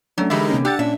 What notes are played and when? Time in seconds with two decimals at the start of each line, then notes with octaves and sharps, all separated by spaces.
0.18 F#3 A3 C#4 D4
0.30 D3 E3 G#3 D#4 G4 A#4 E5 B5
0.49 C3 A#3 C#4
0.65 D4 G4 F#5 E6 A6
0.79 A#2 C#4 D4 E5